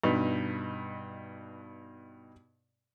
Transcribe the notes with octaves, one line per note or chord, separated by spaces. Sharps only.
G2 B2 D#4